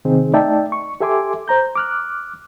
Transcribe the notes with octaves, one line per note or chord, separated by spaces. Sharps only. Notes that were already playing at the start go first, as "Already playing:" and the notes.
C3 D#3 C4 D#4 G#4
A3 D#4 D5 E5 G5 A5
C#6
G4 A4 E5 G#5 C6 D6
C5 A#5 G6
D6 F6 F#6